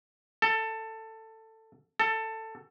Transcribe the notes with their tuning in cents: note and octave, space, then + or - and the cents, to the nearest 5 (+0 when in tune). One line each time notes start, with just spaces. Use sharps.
A4 +15
A4 +15